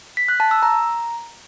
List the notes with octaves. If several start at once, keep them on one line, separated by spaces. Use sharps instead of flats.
B6
F#6
A5
E6
A#5